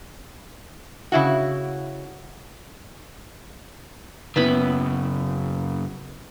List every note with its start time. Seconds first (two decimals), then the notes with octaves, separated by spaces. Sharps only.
1.12 C#3 E4 F#4
4.36 F#2 C#3 B3 E4 B5